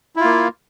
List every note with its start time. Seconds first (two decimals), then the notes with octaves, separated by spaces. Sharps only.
0.16 E4
0.20 F4
0.24 A#3